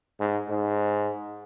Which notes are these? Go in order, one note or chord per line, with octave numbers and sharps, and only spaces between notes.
G#2
G#2